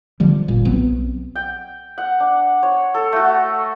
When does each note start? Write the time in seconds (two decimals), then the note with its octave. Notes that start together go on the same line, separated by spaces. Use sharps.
0.20 D3 F3 G3
0.48 G1 A#2 G3
0.65 B1 F#3 B3 C4
1.35 G5
1.98 F#5
2.20 D4
2.63 C#5
2.94 A4
3.13 A3 F#4